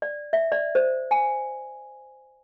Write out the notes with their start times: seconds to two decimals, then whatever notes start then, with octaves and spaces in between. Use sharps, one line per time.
0.02 D5
0.33 E5
0.52 D5
0.75 C5
1.11 G#5